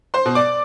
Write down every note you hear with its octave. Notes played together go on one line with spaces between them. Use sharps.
C5 C6
B2
D5 D6